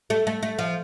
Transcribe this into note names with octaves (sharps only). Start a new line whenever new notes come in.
A3
A3
A3
F3